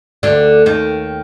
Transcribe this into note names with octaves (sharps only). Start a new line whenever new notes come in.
D2 D3
D#2 D#3